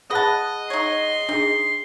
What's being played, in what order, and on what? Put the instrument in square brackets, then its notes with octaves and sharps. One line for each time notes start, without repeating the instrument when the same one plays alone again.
[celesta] G#4 F#5 F#6 [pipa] B4 A5 [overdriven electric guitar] D#5
[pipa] D#4 C#5 [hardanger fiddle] C6
[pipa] D#3 [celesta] D4 G#4